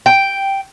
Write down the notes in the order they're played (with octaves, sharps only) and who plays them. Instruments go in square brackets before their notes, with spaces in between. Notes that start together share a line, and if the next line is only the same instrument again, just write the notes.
[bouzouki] G5